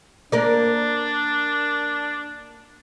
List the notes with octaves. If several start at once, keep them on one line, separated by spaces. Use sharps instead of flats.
A#3 D4 A#4 D5